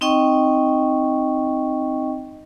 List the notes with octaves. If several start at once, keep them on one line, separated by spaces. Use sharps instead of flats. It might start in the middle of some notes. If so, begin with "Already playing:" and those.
C4 D#4 D#5 G5 C#6